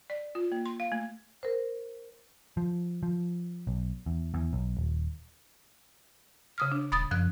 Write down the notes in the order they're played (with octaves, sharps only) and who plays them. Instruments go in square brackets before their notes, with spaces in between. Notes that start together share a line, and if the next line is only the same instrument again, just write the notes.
[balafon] D5
F4
A#3
C6
F5
A3
[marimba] A#4 C5
[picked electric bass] F3
F3
B1
E2
E2
B1
D#1
[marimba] C#3 D#6 F6
D4
[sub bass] D#1 [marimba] B5 D#6 A6
[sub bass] F#2 [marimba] F3 F#6